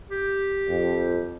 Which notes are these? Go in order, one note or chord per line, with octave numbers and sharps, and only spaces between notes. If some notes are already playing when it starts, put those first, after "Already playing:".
G4
F2